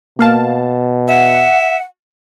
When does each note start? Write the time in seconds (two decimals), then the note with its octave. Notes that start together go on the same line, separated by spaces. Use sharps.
0.19 B2 A#3 F5 A5
1.08 E5 F#5